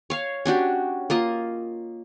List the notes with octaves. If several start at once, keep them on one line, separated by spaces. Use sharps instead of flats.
C#5 F5
C#4 D4 F#4 G4
A#3 F4 D#5